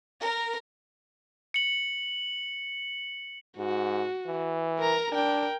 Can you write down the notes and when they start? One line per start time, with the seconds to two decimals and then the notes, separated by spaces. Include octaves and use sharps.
0.21 A#4
1.54 C#7 F#7
3.58 G#2 F#4
4.27 E3
4.79 A#4 A#5
5.12 D4 A#4 G5